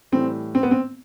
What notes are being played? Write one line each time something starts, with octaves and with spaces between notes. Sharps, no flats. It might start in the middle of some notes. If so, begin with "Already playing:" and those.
A2 E3 G3 C4
C4
B3
C4